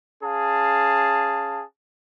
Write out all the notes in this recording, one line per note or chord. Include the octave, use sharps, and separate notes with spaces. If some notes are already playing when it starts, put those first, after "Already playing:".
C#4 G#4 F5 A5